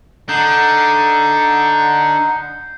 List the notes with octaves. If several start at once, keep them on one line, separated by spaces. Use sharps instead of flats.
D3 D#4 F#5 G6 C7